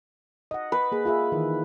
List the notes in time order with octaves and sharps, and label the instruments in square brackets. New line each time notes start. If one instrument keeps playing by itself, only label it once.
[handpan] D#5 F#5
[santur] B4
[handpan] A#3 G#4
F4 G#4 E5
D#3 E3